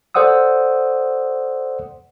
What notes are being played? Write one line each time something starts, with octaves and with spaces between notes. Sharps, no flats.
A4 C5 D5 F#5 D#6 E6